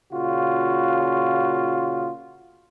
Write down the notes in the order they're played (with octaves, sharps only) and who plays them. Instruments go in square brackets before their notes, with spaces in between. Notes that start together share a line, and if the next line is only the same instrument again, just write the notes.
[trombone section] A#2 C#3 F4 F#4